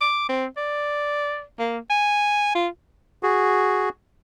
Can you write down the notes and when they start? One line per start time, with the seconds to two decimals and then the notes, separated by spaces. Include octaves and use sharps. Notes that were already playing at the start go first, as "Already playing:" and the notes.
0.01 D6
0.29 C4
0.57 D5
1.59 A#3
1.90 G#5
2.55 F4
3.23 F#4 G#4